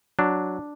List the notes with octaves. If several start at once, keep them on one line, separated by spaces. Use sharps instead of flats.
F#3 D4